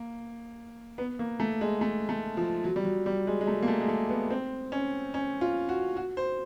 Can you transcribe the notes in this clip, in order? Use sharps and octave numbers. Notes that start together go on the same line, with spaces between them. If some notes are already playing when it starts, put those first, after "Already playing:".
Already playing: A#3
B3
A#3
A3
G#3
A3
A3
F3
F#3
G3
F#3
G3
G#3
G#3
A3
A#3
A3
G#3
A3
B3
C4
C#4
C#4
F4
F#4
F#4
C5